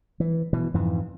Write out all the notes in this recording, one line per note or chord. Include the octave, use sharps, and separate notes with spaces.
E3
B2 E3
F2 G#2 E3